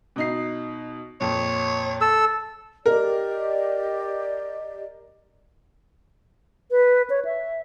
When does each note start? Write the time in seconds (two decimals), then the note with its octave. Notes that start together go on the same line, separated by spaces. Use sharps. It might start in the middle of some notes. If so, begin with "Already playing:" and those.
0.16 B2 D#4 C7
1.21 F2 A#2 C#5
2.01 A4 E6
2.86 G4 A#4 D5 D#5
6.71 B4
7.10 C#5
7.25 E5